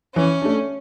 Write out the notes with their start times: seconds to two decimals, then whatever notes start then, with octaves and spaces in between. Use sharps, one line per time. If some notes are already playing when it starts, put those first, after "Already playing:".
0.16 E3 C#4
0.42 A3 D4